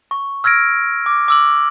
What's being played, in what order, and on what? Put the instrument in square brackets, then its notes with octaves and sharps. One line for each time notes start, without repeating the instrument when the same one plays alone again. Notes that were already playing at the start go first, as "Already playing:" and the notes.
[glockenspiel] C#6
E6 F6 G#6 A#6 D7
D6
D6 E6 F#7